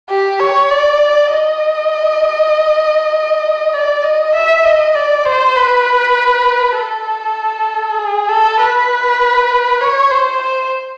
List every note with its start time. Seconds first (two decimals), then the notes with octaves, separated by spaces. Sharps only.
0.10 G4
0.40 C#5
0.70 D5
1.31 D#5
3.74 D5
4.04 D#5
4.35 E5
4.65 D#5
4.95 D5
5.25 C5
5.56 B4
6.77 A4
7.99 G#4
8.28 A4
8.60 B4
9.81 C#5
10.11 C5
10.42 C5